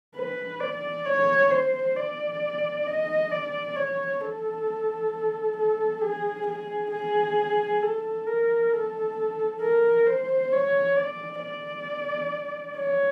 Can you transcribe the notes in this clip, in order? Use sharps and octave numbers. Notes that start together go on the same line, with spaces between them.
B4
D5
C#5
C5
D5
D#5
D5
C#5
A4
A4
G#4
G#4
G#4
A4
A#4
A4
A#4
C5
C#5
D5
D5
C#5